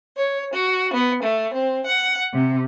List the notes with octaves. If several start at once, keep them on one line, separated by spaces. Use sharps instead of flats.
C#5
F#4
B3
A3
C4
F#5
C3